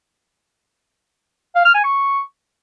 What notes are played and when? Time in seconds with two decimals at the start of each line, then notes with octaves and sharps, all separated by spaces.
1.55 F5
1.65 F6
1.74 G#5
1.84 C#6